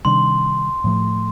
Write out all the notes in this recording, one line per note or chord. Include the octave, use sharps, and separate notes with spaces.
C3 D#3 G3 D4 C6
A2 F3 A3